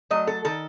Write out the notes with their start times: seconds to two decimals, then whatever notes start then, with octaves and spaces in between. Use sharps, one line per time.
0.10 F#3 A3 D#5
0.27 A4
0.45 D#3 A4